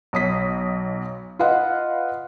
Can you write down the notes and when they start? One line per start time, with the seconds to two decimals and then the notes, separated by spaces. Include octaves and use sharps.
0.13 B1 D#6 B6
1.39 F4 B4 D#5 F5 F#5